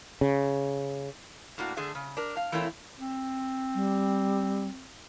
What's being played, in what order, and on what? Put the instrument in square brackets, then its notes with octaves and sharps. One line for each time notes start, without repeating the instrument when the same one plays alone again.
[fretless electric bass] C#3
[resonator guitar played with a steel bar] A2 A#3 D4 F#4
D3 A3 D4 G#4 E5
C#3
D4 A#4
F5
E3 A3 A#3 C4 E4 C#5
[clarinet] C4
[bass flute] G3